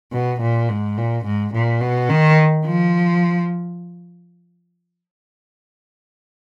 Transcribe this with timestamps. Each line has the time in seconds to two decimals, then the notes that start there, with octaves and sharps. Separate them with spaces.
0.12 B2
0.41 A#2
0.69 G#2
0.98 A#2
1.25 G#2
1.53 A#2
1.81 B2
2.09 D#3
2.65 F3